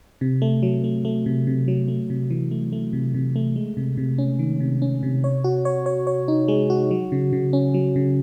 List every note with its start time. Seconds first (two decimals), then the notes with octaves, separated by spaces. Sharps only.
0.21 C3
0.42 A3
0.63 F#3
0.84 A3
1.05 A3
1.26 C3
1.47 C3
1.68 F#3
1.88 A3
2.10 C3
2.30 E3
2.51 A3
2.72 A3
2.93 C3
3.14 C3
3.36 A3
3.56 G#3
3.77 C3
3.97 C3
4.18 C#4
4.39 D#3
4.60 C3
4.82 C#4
5.03 C3
5.24 C#5
5.44 F#4
5.65 C#5
5.86 C#5
6.07 C#5
6.28 D#4
6.48 G#3
6.70 F#4
6.91 F#3
7.12 C#3
7.33 C#3
7.53 C#4
7.74 F#3
7.96 C#3